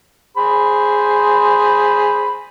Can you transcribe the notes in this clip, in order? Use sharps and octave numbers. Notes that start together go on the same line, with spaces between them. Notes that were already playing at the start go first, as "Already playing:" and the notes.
G#4 C5 B5